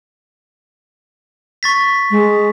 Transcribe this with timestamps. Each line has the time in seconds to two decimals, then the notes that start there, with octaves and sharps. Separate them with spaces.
1.63 C#6 A6 B6
2.11 G#3